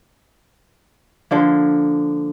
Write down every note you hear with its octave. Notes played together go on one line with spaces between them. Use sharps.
D3 F3 A#3